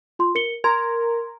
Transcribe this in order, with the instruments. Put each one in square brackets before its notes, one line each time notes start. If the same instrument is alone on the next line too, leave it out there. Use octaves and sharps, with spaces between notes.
[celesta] F4 C6
A#4 C#7 G7
[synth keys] A#4 [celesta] A#5 C6 G#6